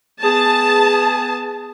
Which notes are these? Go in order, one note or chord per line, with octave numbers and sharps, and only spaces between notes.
B3 G#4 A5